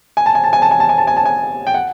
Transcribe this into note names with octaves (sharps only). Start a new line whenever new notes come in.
G#5
A5
G#5
A5
G#5
A5
G#5
A5
G#5
A5
G#5
A5
G#5
G5
F#5